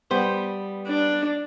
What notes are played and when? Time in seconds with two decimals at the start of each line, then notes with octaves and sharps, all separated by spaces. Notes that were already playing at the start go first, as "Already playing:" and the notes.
0.11 G3 B3 C5
0.88 D4